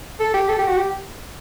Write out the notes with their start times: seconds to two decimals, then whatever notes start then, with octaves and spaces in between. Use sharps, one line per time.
0.20 A4
0.34 G4
0.48 A4
0.58 G4
0.68 F#4
0.77 G4